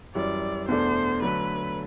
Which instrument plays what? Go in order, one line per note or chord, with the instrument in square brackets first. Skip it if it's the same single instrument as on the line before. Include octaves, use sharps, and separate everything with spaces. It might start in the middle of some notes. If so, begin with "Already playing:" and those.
[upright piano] F#2 E3 G3 [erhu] D5
[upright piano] E2 B2 A3 D4 [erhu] C5
[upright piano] D3 F#3 A3 [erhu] B4